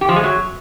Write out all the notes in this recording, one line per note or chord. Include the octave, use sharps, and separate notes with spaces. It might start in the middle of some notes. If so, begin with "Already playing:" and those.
G4
F3
G#3
F#3